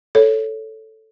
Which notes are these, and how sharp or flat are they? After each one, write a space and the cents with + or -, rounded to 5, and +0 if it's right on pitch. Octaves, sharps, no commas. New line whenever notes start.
A4 +0 C#5 +0